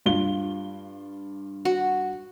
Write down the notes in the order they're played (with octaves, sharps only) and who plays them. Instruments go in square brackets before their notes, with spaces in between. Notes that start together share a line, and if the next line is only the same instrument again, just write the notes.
[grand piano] G2 F4 G7
[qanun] F#4